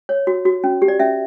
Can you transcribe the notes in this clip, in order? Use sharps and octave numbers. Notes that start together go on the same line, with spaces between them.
C#5
F#4
F#4
C#4
G4
D5
C#4 E5